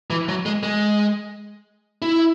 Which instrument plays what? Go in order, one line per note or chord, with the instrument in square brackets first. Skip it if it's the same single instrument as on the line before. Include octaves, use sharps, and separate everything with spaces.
[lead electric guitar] E3
F#3
G#3
G#3
E4